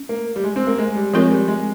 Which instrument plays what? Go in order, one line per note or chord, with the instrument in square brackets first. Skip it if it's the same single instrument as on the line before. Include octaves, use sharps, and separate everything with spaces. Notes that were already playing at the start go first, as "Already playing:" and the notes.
Already playing: [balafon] C#4
[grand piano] A#3
G3
G#3
C4
A#3
G#3
G3
[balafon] F3 C4 F4 A#4 C#5 [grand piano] G#3
[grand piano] G3
G#3